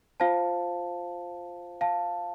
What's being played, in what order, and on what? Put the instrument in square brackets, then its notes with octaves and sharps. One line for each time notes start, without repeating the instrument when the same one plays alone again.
[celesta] F4 C5 F5 A5
F5 A5